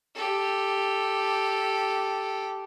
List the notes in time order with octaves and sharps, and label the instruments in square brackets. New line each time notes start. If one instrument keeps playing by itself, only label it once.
[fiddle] G4 A4